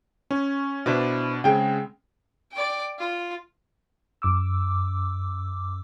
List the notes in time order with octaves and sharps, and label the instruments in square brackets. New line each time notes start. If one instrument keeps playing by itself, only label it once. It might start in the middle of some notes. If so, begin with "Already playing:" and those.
[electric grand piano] C#4
[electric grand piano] B2 D4 [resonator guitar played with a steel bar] E4 B4 C5
[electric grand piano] C#3 G#3 C4 [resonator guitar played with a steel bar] G#4 G5
[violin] D5 G5
F4
[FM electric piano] F#2 D6 E6